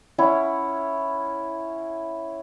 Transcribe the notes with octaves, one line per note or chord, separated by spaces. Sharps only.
C#4 E4 C#5 F#5